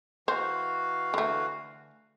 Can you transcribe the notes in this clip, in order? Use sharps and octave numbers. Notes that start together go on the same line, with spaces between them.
E3 F#4 C5 F5
D3 A3